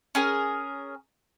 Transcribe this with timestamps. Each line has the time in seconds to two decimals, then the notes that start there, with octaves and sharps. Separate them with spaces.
0.15 C#4 G#4 A#4